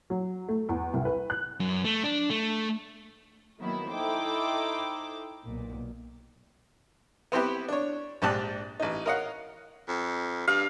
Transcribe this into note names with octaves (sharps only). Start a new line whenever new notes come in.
F#3
A3
E2
C2
B4
F#6
F#2
A3
D4
A3
D#3 F#3 A#3 B3 E4
D#4 E4 A4 C5 G5 D6
B1 A#2
B3 C4 E4 G4 B4
D4 C#5
A#1 G#2 G4 D5 A5 F#6
A1 D#4
A#4 C#5 D#5 F5 F#5
F2
G2 F5